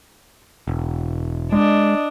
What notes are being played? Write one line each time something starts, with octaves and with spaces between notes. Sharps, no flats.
E1
G#3 D4 D#5